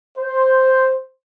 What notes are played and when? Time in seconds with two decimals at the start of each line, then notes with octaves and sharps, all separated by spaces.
0.18 C5